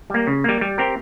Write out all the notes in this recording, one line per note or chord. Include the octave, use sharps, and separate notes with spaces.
G3 A#3
C#3
G3 A#3
G3
C4 G4 A#4